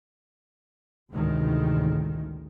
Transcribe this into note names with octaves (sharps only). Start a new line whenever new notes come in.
A1 D2 A2 C3 D#3 G#3